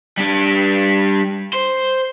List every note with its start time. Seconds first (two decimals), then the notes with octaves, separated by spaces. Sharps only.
0.17 G3 D4
1.53 C5